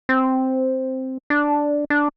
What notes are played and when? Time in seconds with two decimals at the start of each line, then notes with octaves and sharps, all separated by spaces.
0.09 C4
1.30 D4
1.90 D4